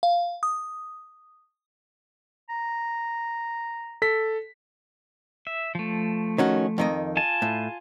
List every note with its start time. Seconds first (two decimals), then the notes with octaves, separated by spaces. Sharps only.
0.03 F5
0.43 D#6
2.49 A#5
4.02 A4 B6
5.47 E5
5.75 F3 A3
6.38 D#3 C#4 F#4
6.78 F2 D#3 D#5
7.17 F4 G#5 A5
7.42 A2